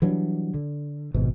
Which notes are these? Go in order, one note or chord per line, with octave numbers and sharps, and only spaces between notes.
E3 F#3 G3 D4
D3
D#1 G#1 G#2 B2